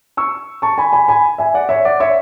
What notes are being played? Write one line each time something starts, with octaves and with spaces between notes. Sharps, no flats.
C#6 E6
A5 C#6
G#5 B5
G#5 B5
G#5 B5
E5 G#5
D5 F#5
C#5 E5
D5 F#5
C#5 E5